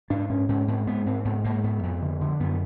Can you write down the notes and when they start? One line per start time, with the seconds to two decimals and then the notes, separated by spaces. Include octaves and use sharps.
0.10 G#2 D4
0.29 G#2 C#4
0.49 G#2 C#4
0.68 G#2 C4
0.87 G#2 B3
1.06 G#2 C4
1.25 G#2 B3
1.44 G#2 A#3
1.64 G#2 B3
1.83 F2
2.02 D3
2.21 D3
2.40 F#2 B3